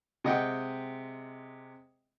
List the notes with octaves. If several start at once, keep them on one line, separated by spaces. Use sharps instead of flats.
C3 G#3 D#5 F#5 G5